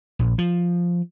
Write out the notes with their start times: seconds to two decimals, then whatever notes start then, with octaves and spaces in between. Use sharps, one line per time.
0.19 A#1
0.38 F3